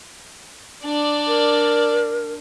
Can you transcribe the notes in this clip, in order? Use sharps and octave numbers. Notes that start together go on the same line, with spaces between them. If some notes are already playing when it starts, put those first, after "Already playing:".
D4 D5
A#4